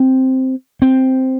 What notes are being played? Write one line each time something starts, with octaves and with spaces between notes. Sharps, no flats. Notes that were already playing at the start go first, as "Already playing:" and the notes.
Already playing: C4
C4